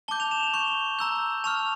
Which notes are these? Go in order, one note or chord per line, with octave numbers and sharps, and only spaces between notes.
A5 D6 G6 G7
F7
E7
F7
C#6 G6 G7
A#5 E6 G6
A5 C#6 F6 F7